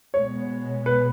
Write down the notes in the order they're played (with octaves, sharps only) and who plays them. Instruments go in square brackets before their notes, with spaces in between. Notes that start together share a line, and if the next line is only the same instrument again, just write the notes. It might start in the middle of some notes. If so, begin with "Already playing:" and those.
[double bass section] B2 G#3 B3 [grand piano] C#5
[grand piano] B4